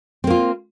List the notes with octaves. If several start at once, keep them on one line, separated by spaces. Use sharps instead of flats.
A#3 C4 F4